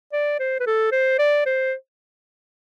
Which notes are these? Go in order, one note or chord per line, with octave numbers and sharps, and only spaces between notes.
D5
C5
B4
A4
C5
D5
C5